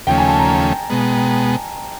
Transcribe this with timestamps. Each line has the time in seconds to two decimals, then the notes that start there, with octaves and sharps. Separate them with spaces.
0.07 D#2 C#3 F3 A3 C#4 G5
0.18 G#5
0.28 A5
0.38 A#5
0.90 B2 G#3 B3